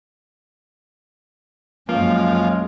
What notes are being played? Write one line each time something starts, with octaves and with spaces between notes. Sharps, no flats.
F#2 F3 G#3 A#3 C#4